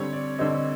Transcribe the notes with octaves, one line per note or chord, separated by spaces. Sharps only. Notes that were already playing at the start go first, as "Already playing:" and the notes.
Already playing: D3 G3 C4 C#5
D5
D3 G3 C4 D#5